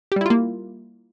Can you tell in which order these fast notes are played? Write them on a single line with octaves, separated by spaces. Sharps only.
G4 G3 E4 F4 A#3